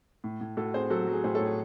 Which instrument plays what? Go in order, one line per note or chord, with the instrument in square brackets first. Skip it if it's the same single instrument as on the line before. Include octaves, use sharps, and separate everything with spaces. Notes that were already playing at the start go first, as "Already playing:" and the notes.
[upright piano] A2
A2
A2 F#4 A4
C4 G#4 C5
F#3 F#4 A4
F#4
F#3
G#4
A2 G#4 C5
A4 C#5
A2
G#4